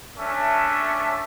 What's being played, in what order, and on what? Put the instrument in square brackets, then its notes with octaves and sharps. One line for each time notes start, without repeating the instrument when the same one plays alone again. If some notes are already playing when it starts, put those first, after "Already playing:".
[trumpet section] A3 C#4 D4 E5